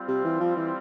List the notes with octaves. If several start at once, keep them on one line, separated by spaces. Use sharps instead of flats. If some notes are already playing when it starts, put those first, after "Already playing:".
Already playing: G3 C4 F4
C3
E3
F3
E3